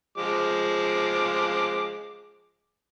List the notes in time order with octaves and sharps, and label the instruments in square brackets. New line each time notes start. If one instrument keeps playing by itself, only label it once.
[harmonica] F3 G#3 D6